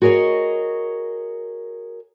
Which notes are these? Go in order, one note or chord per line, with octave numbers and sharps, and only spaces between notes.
F#4 G#4 A#4 C#5 D#5